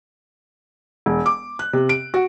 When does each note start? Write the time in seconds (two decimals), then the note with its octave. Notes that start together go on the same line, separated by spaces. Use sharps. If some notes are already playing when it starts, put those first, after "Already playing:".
1.06 E1
1.26 D6
1.59 F#6
1.73 C3
1.89 D7
2.14 F#4